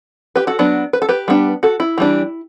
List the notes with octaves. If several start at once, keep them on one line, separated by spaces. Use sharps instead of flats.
G4 B4
F#4 A4
F#3 B3 D4
B4
A4
G4 B4
G3 B3 D4
F#4 A4
E4
E3 G3 D4